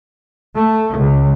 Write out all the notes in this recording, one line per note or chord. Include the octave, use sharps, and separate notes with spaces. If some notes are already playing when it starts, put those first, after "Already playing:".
A3
C#2